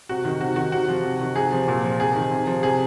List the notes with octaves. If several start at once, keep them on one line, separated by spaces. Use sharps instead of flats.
C3 F#4
D#3
C3 F#4
D#3 F#4
C3 F#4
F3
C3
D#3
C3 G#4
F3
A#2
F3
C3 G#4
D#3
C3
F3
C3 G#4